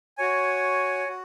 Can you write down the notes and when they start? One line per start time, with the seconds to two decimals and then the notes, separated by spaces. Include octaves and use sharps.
0.18 F#4 C#5 G#5
1.08 F#4